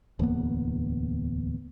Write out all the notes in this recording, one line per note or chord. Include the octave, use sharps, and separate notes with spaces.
D1 E2 A#3 B3